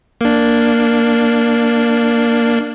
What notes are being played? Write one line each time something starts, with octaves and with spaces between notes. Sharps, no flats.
A#3 D4